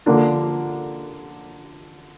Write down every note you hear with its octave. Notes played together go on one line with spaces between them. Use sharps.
D3 F3 A#3 D4 F4